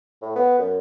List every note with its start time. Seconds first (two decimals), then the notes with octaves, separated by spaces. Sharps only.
0.22 A2
0.36 B3
0.59 F#2